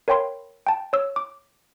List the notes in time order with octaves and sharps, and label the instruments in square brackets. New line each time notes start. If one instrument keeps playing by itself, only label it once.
[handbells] A#4 C#5 F5 G5 B5 C6
G5 A5
C#5 E6
D6